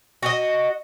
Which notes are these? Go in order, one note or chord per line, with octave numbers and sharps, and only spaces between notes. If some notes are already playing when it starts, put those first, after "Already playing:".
F#4 G4 D#5